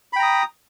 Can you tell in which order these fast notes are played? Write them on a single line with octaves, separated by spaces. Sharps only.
B5 G5 A#5 D#6